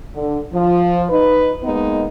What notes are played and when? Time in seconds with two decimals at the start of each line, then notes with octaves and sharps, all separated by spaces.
0.14 D3
0.53 F3
1.10 D#4 B4
1.63 G#3 A#3 B3 D#4